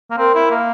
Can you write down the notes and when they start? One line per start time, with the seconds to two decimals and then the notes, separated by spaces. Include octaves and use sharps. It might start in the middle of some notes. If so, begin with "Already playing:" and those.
0.10 A#3
0.18 C4 A#4
0.35 E4
0.51 A#3